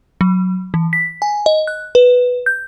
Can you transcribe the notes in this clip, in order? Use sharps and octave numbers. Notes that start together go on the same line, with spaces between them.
F#3
E3
B6
G#5
D#5
F#6
B4
G6